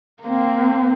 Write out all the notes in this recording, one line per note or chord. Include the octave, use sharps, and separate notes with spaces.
A#3 C4